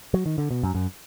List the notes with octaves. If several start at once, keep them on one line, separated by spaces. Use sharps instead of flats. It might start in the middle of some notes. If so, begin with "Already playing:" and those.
F#3
D#3
D3
B2
F#2
F#2